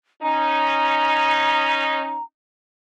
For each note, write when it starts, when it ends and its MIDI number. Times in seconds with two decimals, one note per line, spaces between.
0.22 2.17 61
0.22 2.17 63
0.22 2.23 82